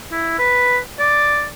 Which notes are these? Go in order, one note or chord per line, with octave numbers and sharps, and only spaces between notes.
E4
B4
D5